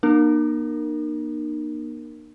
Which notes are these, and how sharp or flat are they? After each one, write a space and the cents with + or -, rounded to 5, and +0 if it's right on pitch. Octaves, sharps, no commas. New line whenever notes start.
A#3 +40 D#4 -40 A#4 +0